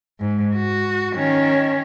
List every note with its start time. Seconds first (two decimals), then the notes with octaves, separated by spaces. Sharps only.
0.20 G#2
0.55 F#4
1.14 D#3 C#4